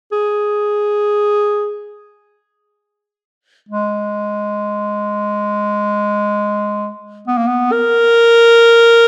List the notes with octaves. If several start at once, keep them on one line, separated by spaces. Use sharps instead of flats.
G#4
G#3
B3
A#3
B3
A#4